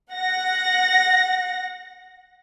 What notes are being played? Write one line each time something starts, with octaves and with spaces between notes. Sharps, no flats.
F#5 A#6